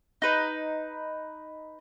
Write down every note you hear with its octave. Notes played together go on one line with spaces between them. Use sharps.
D#4 B4